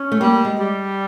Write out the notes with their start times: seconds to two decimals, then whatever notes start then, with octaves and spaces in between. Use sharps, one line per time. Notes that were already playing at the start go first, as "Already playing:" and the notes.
Already playing: C#4
0.12 A3
0.21 G3 A#3
0.45 G#3
0.57 G3